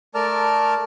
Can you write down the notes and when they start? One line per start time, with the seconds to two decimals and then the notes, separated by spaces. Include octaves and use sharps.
0.15 A3 A#4 D5 A5 F6